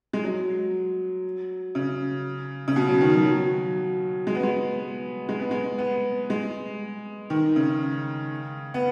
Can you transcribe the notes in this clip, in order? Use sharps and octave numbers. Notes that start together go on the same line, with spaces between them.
G#3
F#3
C#3
C#3
B2
F#3
D#3
F#3
F#3
G#3
B3
G#3
G#3
B3
G#3
B3
G#3
D#3
C#3
B3